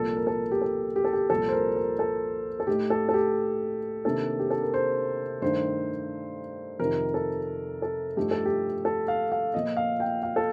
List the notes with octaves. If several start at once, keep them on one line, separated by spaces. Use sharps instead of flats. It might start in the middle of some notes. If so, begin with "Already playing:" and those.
Already playing: C2 A#2 F3 A#3 A4
A#4
A4
G4
A4
G4
A4
G4
C2 A#2 F3 A4
C5
A#4
A#4
A4
A4
A2 A3 D#4 G4
A4
A4
G4
C3 D#3 A#3 D4 A4
G4
A4
A#4
C5
G2 D#3 A3 D4 C5
F2 C3 D#3 A#4
A4
A4
G2 F3 A3 D#4 G4
A4
G4
A4
F5
F5
A#2 F3 A#3 D#5
F5
G5
F5
A4